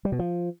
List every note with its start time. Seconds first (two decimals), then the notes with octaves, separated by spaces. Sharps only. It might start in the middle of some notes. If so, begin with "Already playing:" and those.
0.05 G3
0.12 B2
0.19 F3